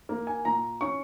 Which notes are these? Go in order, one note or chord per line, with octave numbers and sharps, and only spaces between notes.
A#3
G#5
A#2 A#5
C#4 C#6